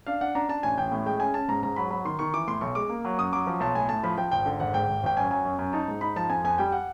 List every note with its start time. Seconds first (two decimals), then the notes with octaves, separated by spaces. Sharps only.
0.07 D4 F5
0.21 D4 F#5
0.35 D4 A#5
0.49 D4 A5
0.63 A1 G#5
0.78 A1 G5
0.92 A2
1.06 G#3 G5
1.20 C#4 G#5
1.34 C#4 A5
1.48 G#2 A#5
1.62 G#2 A#5
1.76 F#3 B5
1.91 F#3 B5
2.05 D#3 C6
2.19 D#3 C#6
2.34 E3 D6
2.47 A2 C6
2.61 B1 C#6
2.75 G#3 D6
2.89 A#3
3.05 F#3
3.18 F#2 D#6
3.33 F#3 D6
3.47 F3
3.60 B1 A5
3.75 A2 G#5
3.89 A2 A5
4.04 F3 B5
4.18 F3 G5
4.31 G#1 G5
4.46 D3
4.60 G#1 F#5
4.74 G#2 G5
4.88 G#1
5.03 G#1 G5
5.17 F#2 G#5
5.31 F#3 G#5
5.45 F#2
5.59 F#2
5.73 D#4 A5
5.88 G#2
6.01 D#4 B5
6.16 F3 A5
6.29 F2 G#5
6.44 F2 G#5
6.58 G3 G5
6.72 F#5